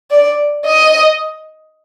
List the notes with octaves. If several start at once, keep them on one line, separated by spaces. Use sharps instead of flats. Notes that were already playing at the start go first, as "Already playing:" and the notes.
D5
D#5